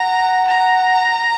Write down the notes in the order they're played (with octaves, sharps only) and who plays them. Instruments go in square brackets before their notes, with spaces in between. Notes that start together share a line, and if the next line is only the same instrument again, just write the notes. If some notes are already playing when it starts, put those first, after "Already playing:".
Already playing: [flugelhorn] F#5 [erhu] A#5
[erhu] A#5